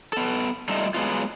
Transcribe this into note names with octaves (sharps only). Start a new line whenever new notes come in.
B3 A4
G3 A3 D#4 F4 A4 D#5
F#3 G#3 B3 D#4 F4